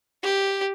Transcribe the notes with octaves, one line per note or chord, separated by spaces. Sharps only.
G4